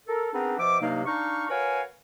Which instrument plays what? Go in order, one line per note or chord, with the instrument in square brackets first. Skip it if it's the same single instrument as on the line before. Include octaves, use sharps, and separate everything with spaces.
[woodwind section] A4 A#4
B3 C4 D4 D#4 G#4 A#4
B2 F3 E5 D6
G2 C3 F#3 A#3 D#4 F5
D4 D#4 F5 C#6
F#4 A#4 B4 C#5 F5 G#5